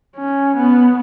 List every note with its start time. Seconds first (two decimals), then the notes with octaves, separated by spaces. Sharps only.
0.16 C#4
0.56 B3